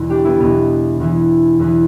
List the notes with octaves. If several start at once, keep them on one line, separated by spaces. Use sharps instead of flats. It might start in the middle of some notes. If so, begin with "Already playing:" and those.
Already playing: E2 B2
D4 G4
B3 E4
E2 B2 B3
E2 E3
E2 E3